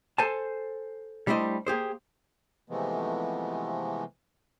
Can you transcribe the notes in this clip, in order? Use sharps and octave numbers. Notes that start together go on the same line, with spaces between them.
A4 C5 G#5 A5
G3 A3 D4 E4 C5 D#5
A#3 G4 G#4 C5
C3 E3 F3 G#3 A3 B3